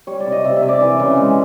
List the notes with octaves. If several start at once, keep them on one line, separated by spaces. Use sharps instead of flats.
G3 C#5
D5
C3
D#5
C3 E5
E5
C3
D5
E3
C#3
G#3